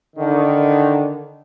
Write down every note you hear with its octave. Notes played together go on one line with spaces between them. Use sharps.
D3 D#3